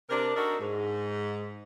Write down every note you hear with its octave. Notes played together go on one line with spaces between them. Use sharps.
C3 D4 A#4
D4 D#4 F#4 A4 A#4 D#5
G#2